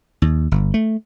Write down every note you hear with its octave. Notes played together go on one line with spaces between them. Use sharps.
D#2
G1
A3